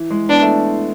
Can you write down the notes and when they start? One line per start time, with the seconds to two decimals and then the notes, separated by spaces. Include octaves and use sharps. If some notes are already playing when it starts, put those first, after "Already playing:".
Already playing: E3
0.10 G#3
0.29 B3 D4
0.42 A3